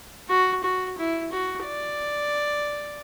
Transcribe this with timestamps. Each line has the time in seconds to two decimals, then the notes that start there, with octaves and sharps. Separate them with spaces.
0.29 F#4
0.64 F#4
0.98 E4
1.32 F#4
1.65 D5